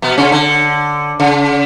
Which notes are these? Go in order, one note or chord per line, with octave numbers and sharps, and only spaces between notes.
B2 B3
C#3 C#4
D3
C#3